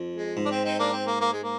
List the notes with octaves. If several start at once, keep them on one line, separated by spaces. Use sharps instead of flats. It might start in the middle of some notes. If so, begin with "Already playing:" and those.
Already playing: F2
G#3
G#2
D4
C4
C4 D#4
A#3 D4
C4
A#3
A#3
G#3
A#3